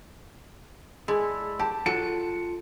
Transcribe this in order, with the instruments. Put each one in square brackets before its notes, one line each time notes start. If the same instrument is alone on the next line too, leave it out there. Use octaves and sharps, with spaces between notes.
[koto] G#3 [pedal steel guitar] E4 A4 D5
[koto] G4 [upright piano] A5
[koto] F#3 A4 [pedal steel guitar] F4 A5 F#6 [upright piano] C#7